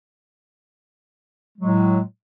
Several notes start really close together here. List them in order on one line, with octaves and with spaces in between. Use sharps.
G#3 F#3 A2